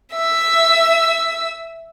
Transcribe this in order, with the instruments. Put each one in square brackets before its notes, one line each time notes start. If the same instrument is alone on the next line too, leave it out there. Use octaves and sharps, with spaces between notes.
[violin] E5 E6